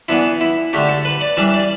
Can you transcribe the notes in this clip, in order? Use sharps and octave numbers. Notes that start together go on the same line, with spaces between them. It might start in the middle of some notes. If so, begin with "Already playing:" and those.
E3 B3 D4 E4
E4
D3 A3 D4 G4
A4
B4
D5
E3 G3 D4 E5
D5